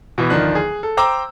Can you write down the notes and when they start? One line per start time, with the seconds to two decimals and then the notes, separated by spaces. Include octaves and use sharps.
0.18 B2 E3 B3
0.30 D1 D#3 F3 D4 F#6
0.55 G#4
0.83 A4
0.97 C5 G5 A#5 D6 E6